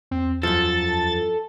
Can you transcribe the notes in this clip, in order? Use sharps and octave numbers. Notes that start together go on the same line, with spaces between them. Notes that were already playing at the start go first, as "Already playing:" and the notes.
E2 C4
F#2 F3 A4 A6